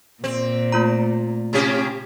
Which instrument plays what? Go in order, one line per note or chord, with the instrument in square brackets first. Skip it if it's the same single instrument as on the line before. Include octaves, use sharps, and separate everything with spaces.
[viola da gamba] A#2 [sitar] C4
[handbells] A3 F4 A#5
[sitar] C3 C#4 G4